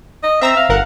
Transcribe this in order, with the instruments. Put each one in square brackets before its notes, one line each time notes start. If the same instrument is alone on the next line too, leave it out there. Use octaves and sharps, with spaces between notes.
[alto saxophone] D#5
[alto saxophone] C4 [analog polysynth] E5 A#5 E6
[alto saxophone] F5
[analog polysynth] G1 A#4 F#5